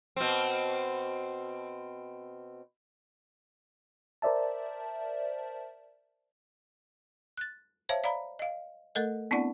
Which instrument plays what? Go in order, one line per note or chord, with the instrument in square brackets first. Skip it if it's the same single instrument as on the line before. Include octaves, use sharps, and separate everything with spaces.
[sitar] B2 C4
[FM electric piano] A#4 C5 D5 E5 A5
[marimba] F#6 A6
C5 C#5 E5 F5 A5
D5 F5 A#5 B5
D#5 F5
A3 A4 A#4 D#5
B3 C4 D4 E4 D5 F#5